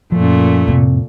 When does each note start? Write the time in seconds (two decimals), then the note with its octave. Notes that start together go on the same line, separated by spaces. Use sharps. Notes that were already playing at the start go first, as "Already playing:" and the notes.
0.12 F#2 A#2 F3 A3
0.68 F2 A2 C3 C4